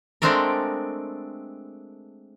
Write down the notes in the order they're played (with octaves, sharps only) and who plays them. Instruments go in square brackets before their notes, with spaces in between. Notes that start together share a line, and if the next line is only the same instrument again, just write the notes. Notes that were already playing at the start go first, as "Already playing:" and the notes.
[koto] G#3 A3 C4 D4 A4 A#4